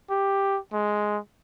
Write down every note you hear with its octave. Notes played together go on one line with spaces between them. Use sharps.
G4
G#3